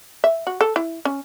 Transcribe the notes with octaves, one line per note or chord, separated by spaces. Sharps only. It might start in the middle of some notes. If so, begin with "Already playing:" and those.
E5
F#4
A4
E4
C#4